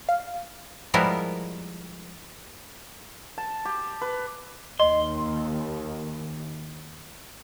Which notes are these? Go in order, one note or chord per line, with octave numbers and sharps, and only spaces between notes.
F5
F3 G3 G#3 B3 E4 A#4
A5
G4
B4
D#2 D#5 C6